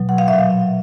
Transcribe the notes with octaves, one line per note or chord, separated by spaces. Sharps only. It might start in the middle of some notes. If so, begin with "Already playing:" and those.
Already playing: B2 F#3
F#5
F5
A#2 F#3 E5
F5